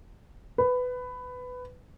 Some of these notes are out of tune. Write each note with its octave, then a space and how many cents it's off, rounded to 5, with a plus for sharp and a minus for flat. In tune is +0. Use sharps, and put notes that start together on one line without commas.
B4 +15